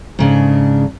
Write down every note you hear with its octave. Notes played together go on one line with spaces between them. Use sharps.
G#2 C#3 D4